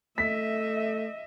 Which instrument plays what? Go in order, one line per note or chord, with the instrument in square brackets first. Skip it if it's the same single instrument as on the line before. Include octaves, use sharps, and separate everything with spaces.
[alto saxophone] A3 [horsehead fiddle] D#5 E5 [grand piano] B6